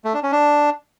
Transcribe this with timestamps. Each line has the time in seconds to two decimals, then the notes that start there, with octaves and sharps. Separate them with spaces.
0.04 A3
0.14 D4
0.23 C#4
0.32 D4